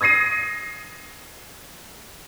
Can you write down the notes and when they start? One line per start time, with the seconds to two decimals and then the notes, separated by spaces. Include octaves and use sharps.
0.01 D#6 G#6 A#6 C7 D#7